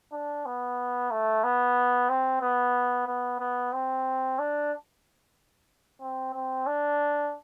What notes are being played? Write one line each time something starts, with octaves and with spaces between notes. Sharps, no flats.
D4
B3
A3
B3
C4
B3
B3
B3
C4
D4
C4
C4
D4